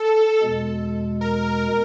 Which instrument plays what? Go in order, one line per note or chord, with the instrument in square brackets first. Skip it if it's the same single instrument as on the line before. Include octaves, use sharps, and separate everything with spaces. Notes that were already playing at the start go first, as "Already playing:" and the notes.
Already playing: [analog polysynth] A4
[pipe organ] E2 B2 G#3
[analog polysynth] A#4
A#4